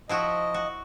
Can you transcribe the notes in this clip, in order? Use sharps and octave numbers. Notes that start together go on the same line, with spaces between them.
F3 E4 F#4 D#5
F#4